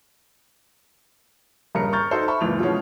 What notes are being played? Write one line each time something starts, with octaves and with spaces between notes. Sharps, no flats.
D#1 G2 C#3 A#4 A#5 C#7
A#5 C#6 F6 G6 A6
D#4 F#4 A4 C5
E5 A5 B5 C#6
F#1 C#2 A#2 E3 F7
B2 D3 E3 F3 G#3 C#4